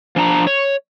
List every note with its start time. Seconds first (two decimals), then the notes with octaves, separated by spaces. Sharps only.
0.16 F3 D4 A5 A#5
0.47 C#5